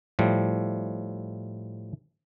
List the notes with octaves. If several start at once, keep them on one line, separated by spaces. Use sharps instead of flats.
A2 F3 G3